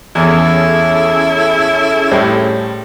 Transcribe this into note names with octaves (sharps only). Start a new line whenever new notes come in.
E2 C#4 E4 G#4 A4
A2 G3 C5